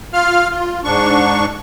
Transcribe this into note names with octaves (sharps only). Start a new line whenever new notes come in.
F4 F5 F6
F4
G#2 D4 C#6